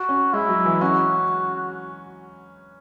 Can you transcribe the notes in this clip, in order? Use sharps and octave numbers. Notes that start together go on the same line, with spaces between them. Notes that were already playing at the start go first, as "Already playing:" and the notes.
Already playing: F#4
C#4
G#3 E4
F#3
E3
C#4 F#4